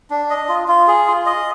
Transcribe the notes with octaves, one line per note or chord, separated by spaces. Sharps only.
D4
D#5
F4
F4
G#4
F4
D#5